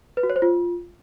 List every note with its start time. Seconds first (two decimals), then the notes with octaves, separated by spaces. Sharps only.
0.17 B4
0.23 F#4
0.30 C#5
0.36 C5
0.42 F4